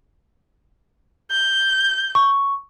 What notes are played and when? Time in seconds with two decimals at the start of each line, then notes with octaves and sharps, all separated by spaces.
1.31 G6
2.15 C#6